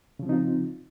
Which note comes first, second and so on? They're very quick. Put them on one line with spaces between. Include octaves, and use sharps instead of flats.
C#3 F3 C4 D#4 F4